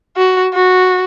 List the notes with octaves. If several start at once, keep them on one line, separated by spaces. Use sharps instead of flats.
F#4
F#4